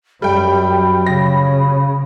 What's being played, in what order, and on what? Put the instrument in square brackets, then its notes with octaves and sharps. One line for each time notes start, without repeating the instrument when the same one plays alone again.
[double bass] F#2 [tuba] F#3 [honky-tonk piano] G3 G5 [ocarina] B5
[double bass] C#3 [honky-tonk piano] A#6